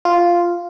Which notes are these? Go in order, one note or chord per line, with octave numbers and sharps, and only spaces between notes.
F4